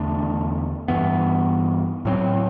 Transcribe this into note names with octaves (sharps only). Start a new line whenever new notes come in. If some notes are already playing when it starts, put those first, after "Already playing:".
Already playing: E2 D3 A3 D4
G2 E3 B3
A2 F#3 C4